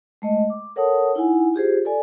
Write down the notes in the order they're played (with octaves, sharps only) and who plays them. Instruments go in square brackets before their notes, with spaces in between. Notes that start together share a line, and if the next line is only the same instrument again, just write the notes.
[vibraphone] G#3 A3 D#5
D6
A4 A#4 C#5 F#5 A5 D#6
D#4 E4 F#5 G#5
F4 G4 G#4 C5
A4 D5 G#5